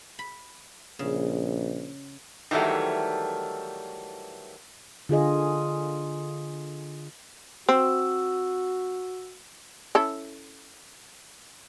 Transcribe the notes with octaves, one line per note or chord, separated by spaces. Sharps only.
B5
A#1 C#3
D#3 E3 F#3 G3 A3
D3 F4 G#4 D#5
C4 F#4 E6
C#4 E4 A4